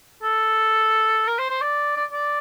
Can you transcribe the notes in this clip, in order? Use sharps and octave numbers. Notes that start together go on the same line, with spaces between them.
A4
A#4
C5
C5
D5
D5
D5